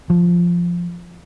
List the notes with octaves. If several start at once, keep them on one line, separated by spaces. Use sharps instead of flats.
F3